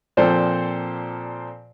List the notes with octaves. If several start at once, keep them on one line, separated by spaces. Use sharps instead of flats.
A#2 F3 C4 A4 C5 D5